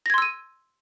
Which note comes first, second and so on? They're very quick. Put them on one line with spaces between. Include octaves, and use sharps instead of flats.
A#6 G#6 C6 E6 D#7